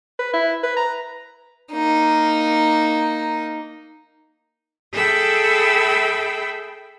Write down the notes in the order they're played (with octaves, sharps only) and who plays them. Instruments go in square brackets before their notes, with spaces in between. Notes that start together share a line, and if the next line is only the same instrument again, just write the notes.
[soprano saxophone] B4
E4
B4
A#5
[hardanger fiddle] A#3 D#4
[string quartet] G#4 A4 E5 G5 B5 E6